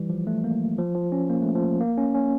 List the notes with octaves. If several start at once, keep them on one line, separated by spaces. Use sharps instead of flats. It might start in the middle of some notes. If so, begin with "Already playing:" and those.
Already playing: E3 G3
F3
A3
A#3
F3
F3
C#4
A#3
A3
F3
A#3
C#4
C#4